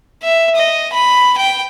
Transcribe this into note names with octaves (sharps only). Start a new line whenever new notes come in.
E5
D#5
B5
G5